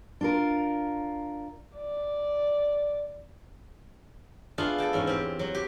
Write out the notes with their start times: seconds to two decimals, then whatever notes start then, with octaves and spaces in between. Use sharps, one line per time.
0.21 D4 F4 A#4
1.76 D5
4.58 A3 B3 D4 F4 G#4
4.78 A4 D#5 G5 A5
4.93 E2 G#2 C#4
5.07 C4 G4
5.39 F#3
5.55 G4